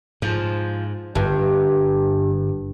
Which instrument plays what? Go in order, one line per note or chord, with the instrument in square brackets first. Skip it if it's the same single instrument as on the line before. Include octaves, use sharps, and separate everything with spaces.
[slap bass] G#2 [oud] F3
[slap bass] G1 [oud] G2